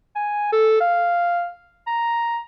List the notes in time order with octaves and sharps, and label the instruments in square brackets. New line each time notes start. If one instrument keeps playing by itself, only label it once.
[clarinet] G#5
A4
F5
A#5